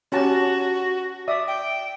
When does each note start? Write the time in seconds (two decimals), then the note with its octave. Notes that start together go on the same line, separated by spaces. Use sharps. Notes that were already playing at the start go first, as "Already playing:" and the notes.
0.12 C#4 F#4 G4 A5
1.28 D5 E5 D#6
1.48 G5